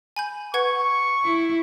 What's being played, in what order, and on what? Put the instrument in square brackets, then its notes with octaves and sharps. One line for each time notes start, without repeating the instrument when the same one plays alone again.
[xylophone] G#5 B5 G6
[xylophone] B4 F#5 G#6 [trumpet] C#6
[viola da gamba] E4